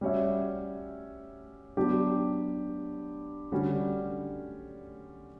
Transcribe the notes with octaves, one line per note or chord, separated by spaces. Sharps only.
G3 C#4 F#4 C#5 E5
F#3 B3 D4 G4
D3 G3 C#4 F#4